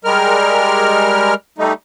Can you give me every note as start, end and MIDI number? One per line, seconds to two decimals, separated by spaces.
0.05 1.34 55
0.05 1.34 56
0.05 1.34 70
0.05 1.34 89
1.58 1.73 55
1.58 1.73 57
1.58 1.73 63